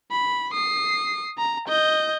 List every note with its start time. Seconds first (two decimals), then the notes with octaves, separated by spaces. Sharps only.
0.11 B5
0.53 D#6 C7
1.38 A#5
1.68 D#5 G6